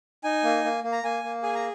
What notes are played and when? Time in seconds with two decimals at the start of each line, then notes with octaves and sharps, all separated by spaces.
0.24 D#4 G#5
0.43 A#3
0.64 A#3
0.84 A#3
0.92 A#5
1.03 A#3 G#5
1.24 A#3
1.43 G#4 G#5
1.55 A#5